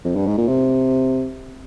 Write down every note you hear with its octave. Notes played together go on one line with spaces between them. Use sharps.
F2
G2
G#2
A#2
C3